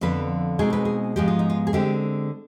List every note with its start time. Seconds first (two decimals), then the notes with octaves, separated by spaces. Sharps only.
0.01 F2 D3 F3 B3 D4 B4
0.59 B2 G#3 C4 D#4 G#4
0.73 B4
0.85 G#4
1.16 G#2 F3 G#3 B3 G4
1.28 F4
1.39 D#4
1.50 F4
1.67 G#4
1.73 D3 G#3 C4 G4